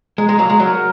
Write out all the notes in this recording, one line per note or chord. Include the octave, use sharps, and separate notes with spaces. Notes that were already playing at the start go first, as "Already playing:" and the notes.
G#3 A#5
G#3
F#3 A#3 A#5
G#3
F#3 A#4